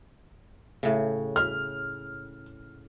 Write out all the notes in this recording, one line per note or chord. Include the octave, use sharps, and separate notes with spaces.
A2 C#3
F6